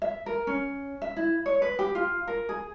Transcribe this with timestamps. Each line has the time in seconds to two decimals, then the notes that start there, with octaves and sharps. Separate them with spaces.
0.02 E5
0.26 A#4
0.47 C#4
1.02 E5
1.16 E4
1.46 C#5
1.62 B4
1.79 G4
1.95 F4
2.27 A#4
2.49 G#4